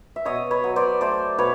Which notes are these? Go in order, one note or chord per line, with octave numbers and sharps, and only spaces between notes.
E5
B2 C#5 D#5
B4 C#5
F#3
C5 D5
A3 C5 D5
B2 B4 C#5